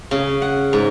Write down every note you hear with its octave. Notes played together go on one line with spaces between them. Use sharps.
C#3
F#5
G#2